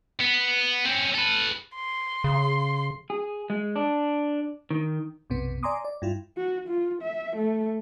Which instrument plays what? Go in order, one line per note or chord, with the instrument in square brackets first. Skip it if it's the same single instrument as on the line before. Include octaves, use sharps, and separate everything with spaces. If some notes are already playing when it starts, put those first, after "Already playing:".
[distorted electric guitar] B3
C4 C#4
A4 B4
[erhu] C6
[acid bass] C#3
[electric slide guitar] G#4
G#3
D4
D#3
[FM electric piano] B1 F#2 C3 B3
D5 G#5 A#5 C6 D6 D#6
D5
G2 E4 F4
[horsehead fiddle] F#4
F4
E5
A3